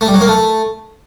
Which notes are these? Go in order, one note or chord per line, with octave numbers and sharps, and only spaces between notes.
A3
G3
F#3
A#3
A3